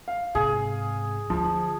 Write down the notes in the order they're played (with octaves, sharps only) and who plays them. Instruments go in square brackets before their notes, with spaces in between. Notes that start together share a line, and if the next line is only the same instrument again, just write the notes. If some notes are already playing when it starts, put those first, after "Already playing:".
[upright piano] F5
[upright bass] G#2 C3 [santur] G#4
[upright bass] D2 [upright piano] F3